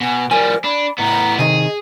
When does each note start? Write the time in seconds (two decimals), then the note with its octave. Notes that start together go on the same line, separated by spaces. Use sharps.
0.01 B2 G#5
0.31 F3 G3 A#4 G#5
0.64 D4 B5
0.98 A2 B3 A#5
1.39 C3 D#3 G#4 D#5